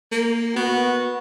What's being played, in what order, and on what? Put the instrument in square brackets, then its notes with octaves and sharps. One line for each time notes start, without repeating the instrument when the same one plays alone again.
[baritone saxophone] A#3
[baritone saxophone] B3 [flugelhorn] F#4